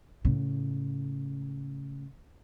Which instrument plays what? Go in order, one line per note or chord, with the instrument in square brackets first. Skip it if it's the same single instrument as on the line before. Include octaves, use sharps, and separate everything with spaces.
[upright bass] A2 C#3